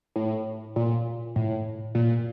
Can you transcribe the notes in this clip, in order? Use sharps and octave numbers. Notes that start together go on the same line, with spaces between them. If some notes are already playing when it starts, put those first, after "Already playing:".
A2
A#2
A2
A#2